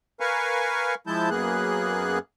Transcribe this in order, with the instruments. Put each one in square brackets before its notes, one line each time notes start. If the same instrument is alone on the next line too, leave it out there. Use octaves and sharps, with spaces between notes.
[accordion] A#4 B4 F5 G#5 C#6
F3 G#3 E4 A5 G6
F#2 A#3 B3 G#4 F#6